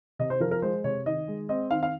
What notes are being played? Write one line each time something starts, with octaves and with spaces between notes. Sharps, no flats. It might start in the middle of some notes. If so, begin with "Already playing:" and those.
C3 D#5
C5
F3 A#4
A#4
G#3 C5
C3 C#5
D#3 D#5
G#3
C4 D#5
D#3 F5
F5